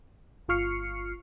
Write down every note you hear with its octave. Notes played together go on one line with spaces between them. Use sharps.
G1 F4 C#6 F6 C7 C#7